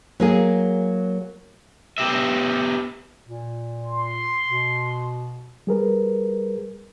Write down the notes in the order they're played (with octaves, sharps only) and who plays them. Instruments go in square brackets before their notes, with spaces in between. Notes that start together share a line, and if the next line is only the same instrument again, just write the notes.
[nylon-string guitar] F#3 A#3 G#4
[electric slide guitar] B3 G4 E5
[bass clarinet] A#2
[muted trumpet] C6
[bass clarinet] B2
[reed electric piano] G3 G#4 A#4 B4